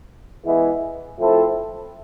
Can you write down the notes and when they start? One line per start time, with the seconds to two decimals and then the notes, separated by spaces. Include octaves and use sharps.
0.45 E3 G#3 B3 E4 G#4
1.18 F3 A3 C4 E4 A4